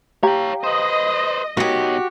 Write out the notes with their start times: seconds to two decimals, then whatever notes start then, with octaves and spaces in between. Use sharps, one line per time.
0.23 G4 C#5 F5 G5 A#5
0.64 B4 C5 D#5
1.57 B2 D#4 F#4 G4 A#4 C#5